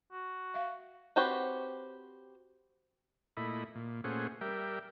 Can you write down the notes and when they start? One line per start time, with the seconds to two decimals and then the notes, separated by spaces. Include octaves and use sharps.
0.12 F#4
0.54 E5 F5
1.16 C4 F#4 G4 B4 C#5
3.37 A#2 A3 E4 D#5 B5
3.75 A#2
4.04 A#2 A3 C#4 G#4 C5 F#5
4.41 G3 A#4 E5 G5